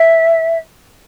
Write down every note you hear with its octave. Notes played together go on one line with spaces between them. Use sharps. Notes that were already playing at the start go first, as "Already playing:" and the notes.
Already playing: E5